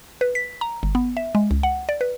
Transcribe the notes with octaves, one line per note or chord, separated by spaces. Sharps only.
B4
B6
A#5
G1
B3
E5
G#3
C#2
F#5
D5
B4